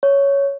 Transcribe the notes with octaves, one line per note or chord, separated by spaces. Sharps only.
C#5